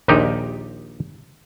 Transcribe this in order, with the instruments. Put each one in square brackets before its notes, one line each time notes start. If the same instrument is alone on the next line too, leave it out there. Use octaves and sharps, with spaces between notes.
[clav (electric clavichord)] A#1 D#2 A#2 D#4 G4